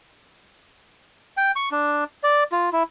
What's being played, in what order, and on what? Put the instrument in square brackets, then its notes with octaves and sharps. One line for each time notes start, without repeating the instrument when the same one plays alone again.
[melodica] G5
C#6
D4
D5
F4
E4